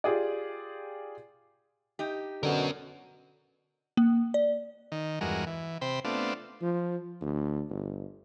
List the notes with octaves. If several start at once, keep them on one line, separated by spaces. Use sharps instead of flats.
F4 G4 G#4 D5
D#4 G4
B2 D3 C#4 A#4
A#3
D5
D#3
E2 G2 G#3 F#4 A#4
E3
C3 C5 G5 B5
A3 B3 C4 D4 F4
F3
D2
G1